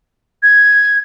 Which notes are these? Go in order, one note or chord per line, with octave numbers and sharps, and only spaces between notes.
G#6